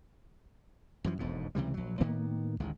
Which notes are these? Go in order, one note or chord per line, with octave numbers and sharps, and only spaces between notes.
F#2 E3 F3
E1 B1 F2 G#2
C#2 C3 E3 G3
A#1 F#3
A2 D#3 A#3 B3
A1 D2 D#3 G#3